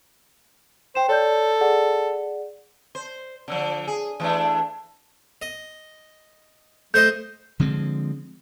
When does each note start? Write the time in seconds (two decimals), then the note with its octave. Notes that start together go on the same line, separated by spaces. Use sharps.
0.95 C5 G5 E7
1.09 A4 C#5 D5 G6
1.61 G#4 D5 F#5
2.95 C5
3.48 D3 F3
3.87 G#4
4.20 E3 A3 D4
5.42 D#5
6.94 A3 C5 D#5 G6
7.59 D3 F3 G#3 C4